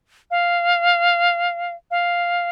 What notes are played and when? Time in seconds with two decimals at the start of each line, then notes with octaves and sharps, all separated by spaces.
0.31 F5
1.91 F5